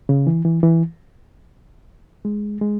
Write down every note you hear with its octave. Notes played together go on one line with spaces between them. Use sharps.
C#3
E3
E3
E3
G#3
G#3